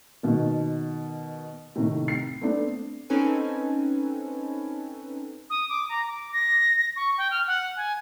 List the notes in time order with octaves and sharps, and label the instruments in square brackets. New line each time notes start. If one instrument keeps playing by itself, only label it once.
[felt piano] B2 D#3
A2 C3 D#3
C7
A3 B3 C4 D4
[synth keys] C4 C#4 D#4 A4 B4 G#5
[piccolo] D#6
D6
A#5
D6
A#6
C#6
G5
F6
F#5
G#5